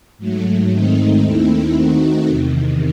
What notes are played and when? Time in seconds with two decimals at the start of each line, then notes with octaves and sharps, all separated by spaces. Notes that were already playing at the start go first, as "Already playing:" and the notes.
0.18 G#2 F#3 A3
0.70 G#2 D#3 A3 C4 D#4
1.22 D#2 D#3 A3 C4 E4
1.74 D#3 A3 C4 D#4 F#4
2.25 E2 C3 D#3